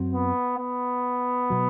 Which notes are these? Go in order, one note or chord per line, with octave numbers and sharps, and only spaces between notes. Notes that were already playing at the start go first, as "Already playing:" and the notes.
Already playing: F#2 F#3 C4
B3
B3
B2 F#3